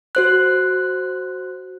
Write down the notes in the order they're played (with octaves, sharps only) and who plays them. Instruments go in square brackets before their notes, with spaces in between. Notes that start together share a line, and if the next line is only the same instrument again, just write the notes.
[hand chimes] F#4 C5 F#6